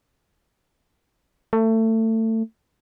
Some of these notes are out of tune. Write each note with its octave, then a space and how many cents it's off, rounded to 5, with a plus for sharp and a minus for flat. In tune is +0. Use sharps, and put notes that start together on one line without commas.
A3 +25